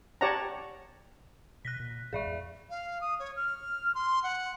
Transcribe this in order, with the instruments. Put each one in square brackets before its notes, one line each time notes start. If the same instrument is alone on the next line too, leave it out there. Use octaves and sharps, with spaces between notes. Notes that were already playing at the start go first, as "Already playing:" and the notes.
[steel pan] G4 C#5 D5 F#5 A5 A#5
[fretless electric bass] B2 [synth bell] F#6 A#6 B6
[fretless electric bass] A#2
[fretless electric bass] A1 G#2 G#3 [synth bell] G#4 D5 E5
[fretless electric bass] E2
[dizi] F5
D#6
C#5
F6
C6
F#5